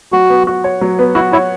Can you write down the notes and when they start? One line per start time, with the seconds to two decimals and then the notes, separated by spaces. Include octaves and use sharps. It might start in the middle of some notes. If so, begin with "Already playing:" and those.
0.12 F#3 F#4
0.30 B3
0.47 F#4
0.64 C#5
0.81 F#3
0.99 B3
1.15 E4 F#4
1.32 E4 C#5